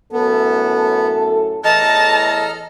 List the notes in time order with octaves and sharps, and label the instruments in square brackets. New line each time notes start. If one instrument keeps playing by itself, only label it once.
[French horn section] F#2 A2 A4 [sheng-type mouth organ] B3
[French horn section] E2 A2 E3 [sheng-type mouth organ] A4 A#5 F6 [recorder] D#5 [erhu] A5